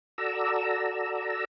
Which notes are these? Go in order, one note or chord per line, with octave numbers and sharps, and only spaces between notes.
F#4 A4 D5 A#5 E6